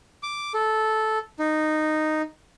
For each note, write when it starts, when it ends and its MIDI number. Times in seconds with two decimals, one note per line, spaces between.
0.23 0.53 86
0.54 1.18 69
1.39 2.22 63